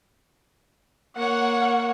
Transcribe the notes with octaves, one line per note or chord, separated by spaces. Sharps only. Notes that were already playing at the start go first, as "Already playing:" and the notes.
A#3 C#5 F#5